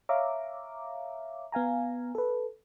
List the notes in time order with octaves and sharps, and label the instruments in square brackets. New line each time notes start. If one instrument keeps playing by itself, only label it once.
[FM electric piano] C#5 E5 F5 A#5 D6
B3 F5 G#5 A#5
A4 B4